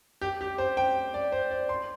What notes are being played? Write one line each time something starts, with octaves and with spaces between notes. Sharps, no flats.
G4
G4
C5
G5
D5
C5
D5
C6